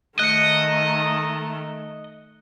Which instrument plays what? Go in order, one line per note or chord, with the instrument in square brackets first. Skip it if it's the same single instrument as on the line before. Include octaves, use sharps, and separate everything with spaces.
[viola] D#3 A3 [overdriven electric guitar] D#5 [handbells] F#6 C#7